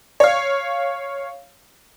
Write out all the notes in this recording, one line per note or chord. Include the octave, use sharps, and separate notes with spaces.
C#5 F5